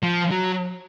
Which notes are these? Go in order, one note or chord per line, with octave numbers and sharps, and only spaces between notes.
F3
F#3